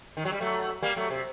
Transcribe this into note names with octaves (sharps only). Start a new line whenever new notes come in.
D#3
F#3
G3
F#3 A3
G3 A#3
F#3 A3
C3